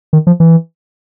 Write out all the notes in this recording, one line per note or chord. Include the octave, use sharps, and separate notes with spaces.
D#3
F3
E3